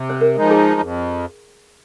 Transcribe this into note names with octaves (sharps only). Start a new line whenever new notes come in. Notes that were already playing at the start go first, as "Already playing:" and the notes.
Already playing: C3
C5
A#4
F3 G#3 D#4
G#4
F2